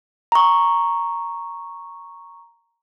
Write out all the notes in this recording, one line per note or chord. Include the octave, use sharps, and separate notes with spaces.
A#5 C#6